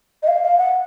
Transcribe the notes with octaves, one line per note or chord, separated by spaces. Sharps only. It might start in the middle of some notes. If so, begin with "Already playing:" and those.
D#5
F5
F5
F#5